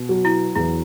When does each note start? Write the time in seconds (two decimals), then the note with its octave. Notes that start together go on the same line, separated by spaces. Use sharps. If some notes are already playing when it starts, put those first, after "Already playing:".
Already playing: B2
0.09 F#3
0.25 E4
0.56 E2 E4